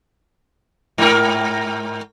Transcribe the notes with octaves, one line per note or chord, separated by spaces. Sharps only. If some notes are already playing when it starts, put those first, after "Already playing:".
G#2 A#4